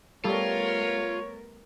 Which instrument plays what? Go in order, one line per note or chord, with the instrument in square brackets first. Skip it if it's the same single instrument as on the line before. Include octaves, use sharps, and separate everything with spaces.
[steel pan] G3 A4 [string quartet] A3 B3 A#4 [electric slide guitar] F4 [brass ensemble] C#5